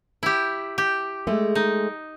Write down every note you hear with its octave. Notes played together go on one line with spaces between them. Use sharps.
E4 G4
G4
G#3 A3
D#4